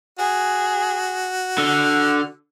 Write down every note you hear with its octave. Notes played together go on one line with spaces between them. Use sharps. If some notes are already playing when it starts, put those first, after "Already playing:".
F#4 G#4
D3 F6